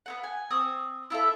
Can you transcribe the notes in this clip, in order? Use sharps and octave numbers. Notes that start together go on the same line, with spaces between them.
B3 C4 F#5
G#5
C4 C#6 D#6
E4 F4 A4 E5